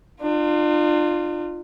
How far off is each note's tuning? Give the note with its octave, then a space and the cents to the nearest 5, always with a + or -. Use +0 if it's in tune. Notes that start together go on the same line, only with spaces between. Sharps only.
D4 +45 F4 +0